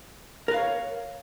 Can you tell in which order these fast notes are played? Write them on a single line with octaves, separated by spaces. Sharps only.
A#4 B4 F5 C#5